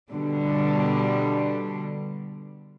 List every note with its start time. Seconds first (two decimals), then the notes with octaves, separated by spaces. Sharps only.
0.12 B2 D3 G3